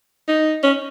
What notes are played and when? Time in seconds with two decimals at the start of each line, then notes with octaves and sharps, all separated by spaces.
0.28 D#4
0.63 C#4